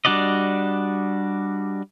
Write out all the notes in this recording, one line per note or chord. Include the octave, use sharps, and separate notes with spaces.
G3 D4 F#4 D5 D#5